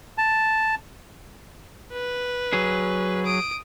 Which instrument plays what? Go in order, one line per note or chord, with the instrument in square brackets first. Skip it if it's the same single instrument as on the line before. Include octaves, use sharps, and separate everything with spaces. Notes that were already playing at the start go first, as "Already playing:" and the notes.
[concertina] A5
[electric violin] B4
[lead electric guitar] F#3 G#4
[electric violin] D#6 D7